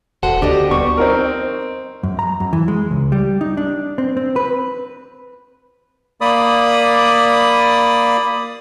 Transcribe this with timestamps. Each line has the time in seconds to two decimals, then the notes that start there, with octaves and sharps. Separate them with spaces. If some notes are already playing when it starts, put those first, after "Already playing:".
0.23 E1 F#4 A4 C5 F#5
0.42 D2 D4 G4 D#5
0.71 G3 B3 C#6
0.97 C4 D#4 A#4
2.03 F#2
2.19 A#5
2.40 F#2
2.53 E3
2.68 G#3
2.91 C#2
3.12 G3
3.41 D#4
3.57 D4
3.98 C4
4.17 C4
4.36 B4
6.21 A#3 D5 B5 D#6